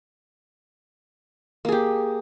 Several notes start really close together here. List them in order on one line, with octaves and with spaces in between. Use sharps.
A#3 G#4 G4